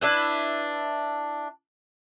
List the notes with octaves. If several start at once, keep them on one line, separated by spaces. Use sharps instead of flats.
D4 E4 B4